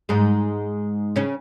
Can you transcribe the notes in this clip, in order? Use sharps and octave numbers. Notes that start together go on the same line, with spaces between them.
G#2 G#3
C#3 C#4